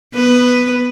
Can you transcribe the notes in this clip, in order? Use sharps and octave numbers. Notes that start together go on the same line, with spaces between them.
B3 B4